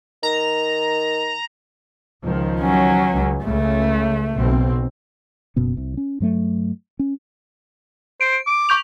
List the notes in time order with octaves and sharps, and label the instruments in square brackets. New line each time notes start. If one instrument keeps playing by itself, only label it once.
[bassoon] D#3 [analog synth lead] A#5
[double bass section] C#2 D#3 F3
[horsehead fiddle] F#3 C#4
[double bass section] C#2
[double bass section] C#2 C#3 [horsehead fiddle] A3
[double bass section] B1 B2 C4
[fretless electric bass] F#1 F#2 B2 B3
C2 C3
C#4
G2 F#3 A3
C#4
[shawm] C5 [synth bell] D7
[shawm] D6
[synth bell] C#6 G6 F7